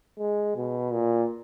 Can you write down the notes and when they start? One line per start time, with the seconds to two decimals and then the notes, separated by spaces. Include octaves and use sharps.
0.19 G#3
0.56 B2
0.92 A#2